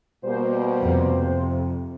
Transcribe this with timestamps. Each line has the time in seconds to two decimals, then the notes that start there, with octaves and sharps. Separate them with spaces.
0.23 B2 G3 A#3 C5
0.80 F2 C3